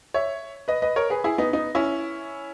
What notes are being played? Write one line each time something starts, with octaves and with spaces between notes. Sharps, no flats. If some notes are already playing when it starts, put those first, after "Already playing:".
C#5 E5
B4 D#5
B4 D#5
A#4 C#5
G#4 B4
E4 G#4
B3 D#4
B3 D#4
C#4 E4